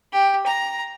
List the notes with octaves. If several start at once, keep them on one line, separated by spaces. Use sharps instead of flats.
G4
A#5